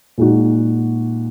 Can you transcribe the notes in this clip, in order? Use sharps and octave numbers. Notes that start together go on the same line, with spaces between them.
A#2 G#3 D#4 F#4